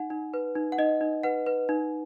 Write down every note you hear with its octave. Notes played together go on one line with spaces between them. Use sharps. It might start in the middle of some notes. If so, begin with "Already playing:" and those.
Already playing: D#4 F#5
D#4
B4
D#4
F#5
D#4 D#5
D#4
B4 F#5
B4
D#4